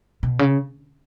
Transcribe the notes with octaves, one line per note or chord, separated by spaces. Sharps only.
B2
C#3